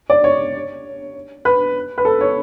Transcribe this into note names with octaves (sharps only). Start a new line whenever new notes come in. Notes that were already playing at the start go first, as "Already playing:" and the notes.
D5
C#5
B4
B4
A4
C#5